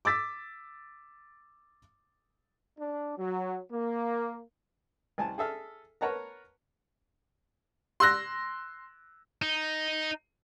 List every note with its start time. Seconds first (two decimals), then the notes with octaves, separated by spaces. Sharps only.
0.05 D6 E6 A6 B6
2.80 D4
3.18 F#3
3.71 A#3
5.18 C2 G#5 A5
5.38 G#4 A4 E5 F6
6.01 A#4 B4 C#5 F#5 A5 A#5
8.00 C6 E6 F#6 A#6
9.42 D#4